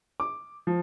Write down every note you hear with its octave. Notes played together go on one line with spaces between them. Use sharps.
D6
F3